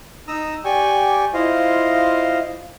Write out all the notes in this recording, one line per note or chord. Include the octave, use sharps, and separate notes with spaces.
D#4 A#5 D#6 E6
G4 D5 G5 G#5 C#6
E4 F4 C5 D#5 F5